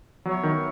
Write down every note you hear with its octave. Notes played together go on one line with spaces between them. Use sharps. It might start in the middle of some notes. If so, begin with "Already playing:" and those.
F#3 B3 F#4 C#5 E5
D#3